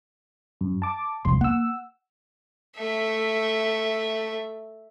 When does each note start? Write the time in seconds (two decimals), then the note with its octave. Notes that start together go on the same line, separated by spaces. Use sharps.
0.61 F#2
0.82 A5 D6
1.25 E1 C2 F2 C6
1.41 A#3 F#5 E6
2.77 A3 E5